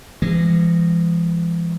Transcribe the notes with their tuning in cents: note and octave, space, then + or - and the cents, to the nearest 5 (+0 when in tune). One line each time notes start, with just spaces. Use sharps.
E3 +45 G#3 -20